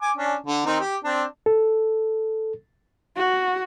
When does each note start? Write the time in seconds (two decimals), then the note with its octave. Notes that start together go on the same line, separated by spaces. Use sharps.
0.02 G#5 D6
0.16 C#4 D4
0.46 D3
0.66 D#3 C4 D#4
0.80 G4
1.04 C4 D4
1.46 A4
3.17 F#4